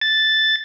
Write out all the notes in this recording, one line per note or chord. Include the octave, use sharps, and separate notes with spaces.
A6